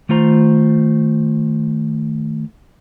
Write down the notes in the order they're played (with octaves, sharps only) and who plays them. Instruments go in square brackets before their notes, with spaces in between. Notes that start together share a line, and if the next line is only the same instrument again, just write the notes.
[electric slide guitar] D#3 A3 F4 C5 A#5